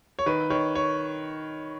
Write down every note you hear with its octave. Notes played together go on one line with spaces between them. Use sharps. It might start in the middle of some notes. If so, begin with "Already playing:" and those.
C#5
D#3 B4
D#3 C#5
C#5